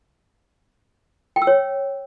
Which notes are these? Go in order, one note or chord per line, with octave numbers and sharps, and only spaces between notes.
G5
E6
C#5